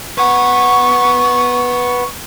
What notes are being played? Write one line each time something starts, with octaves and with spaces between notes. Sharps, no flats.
B4 F#5 C#6